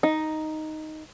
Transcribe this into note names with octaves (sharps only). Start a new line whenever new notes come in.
D#4